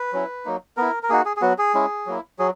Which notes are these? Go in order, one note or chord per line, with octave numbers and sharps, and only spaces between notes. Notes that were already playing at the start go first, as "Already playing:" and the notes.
Already playing: B4
F#3 C#4 E4
F#3 A#3 D#4
B3 E4 A#4
A#4
A#3 D#4 F#4 G#4
G#4
G#4
F#3 B3 F#4
G#4
G#3 C#4 E4
F#3 A#3 E4
F#3 G#4